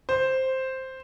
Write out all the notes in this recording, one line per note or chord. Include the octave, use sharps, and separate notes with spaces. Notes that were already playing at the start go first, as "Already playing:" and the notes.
C5